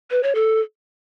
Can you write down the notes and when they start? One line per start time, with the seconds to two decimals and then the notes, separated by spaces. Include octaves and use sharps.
0.11 B4
0.23 C#5
0.35 A4